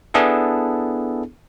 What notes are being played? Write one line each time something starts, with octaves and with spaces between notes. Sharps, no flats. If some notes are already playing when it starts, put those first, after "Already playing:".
B3 D4 E4 G#4 A4